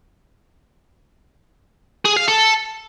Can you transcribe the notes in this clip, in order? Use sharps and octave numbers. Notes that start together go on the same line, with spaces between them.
G#4
F5
A4